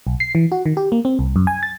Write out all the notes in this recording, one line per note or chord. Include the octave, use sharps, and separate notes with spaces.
B1
C7
E3
F#4
D#3
G4
A#3
C4
C2
F#2
G#5
A6